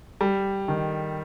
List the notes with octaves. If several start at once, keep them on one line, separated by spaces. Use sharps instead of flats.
G3
D#3